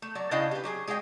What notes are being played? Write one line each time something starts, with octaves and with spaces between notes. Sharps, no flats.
A3
F#3 D5
C#3 D4 E4 D#5 F5 G5
G4 B4
F#3 G4 G#4
G#3 G#4 D#5 E5 G5